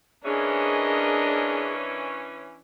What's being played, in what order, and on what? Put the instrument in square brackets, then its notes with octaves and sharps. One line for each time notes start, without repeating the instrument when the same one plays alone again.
[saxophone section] E3 C#4 [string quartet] D4 A#4 D#5 [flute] G#4